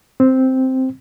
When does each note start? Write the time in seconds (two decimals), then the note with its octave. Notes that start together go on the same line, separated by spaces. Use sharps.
0.20 C4